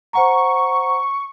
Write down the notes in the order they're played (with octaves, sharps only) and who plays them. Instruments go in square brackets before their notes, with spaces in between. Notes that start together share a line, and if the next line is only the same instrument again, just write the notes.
[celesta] C5 F#5 A#5 [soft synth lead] C#6